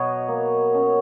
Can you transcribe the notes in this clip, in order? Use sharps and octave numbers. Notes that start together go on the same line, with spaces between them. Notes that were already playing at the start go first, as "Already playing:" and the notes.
Already playing: B2 F#3 B4 C#5 D#5
A#3
C#4